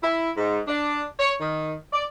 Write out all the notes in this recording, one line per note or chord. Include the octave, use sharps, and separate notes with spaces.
E4
G#2
D4
C#5
D#3
D5